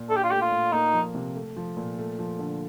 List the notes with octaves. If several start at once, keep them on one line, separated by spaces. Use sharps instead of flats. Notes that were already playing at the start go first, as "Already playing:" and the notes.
Already playing: A#2
D4 A4
G4
F4
A3 G4
F4
A#2
A#3 D#4
F3
C3
A3
F3
A#2
A3
F3
D3